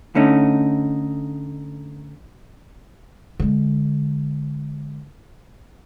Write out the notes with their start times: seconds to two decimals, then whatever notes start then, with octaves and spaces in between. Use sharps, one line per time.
0.15 D3 A3 C#4 D#4
3.40 D3 G#3